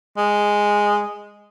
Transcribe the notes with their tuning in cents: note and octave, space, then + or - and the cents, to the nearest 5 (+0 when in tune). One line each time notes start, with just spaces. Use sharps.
G#3 -5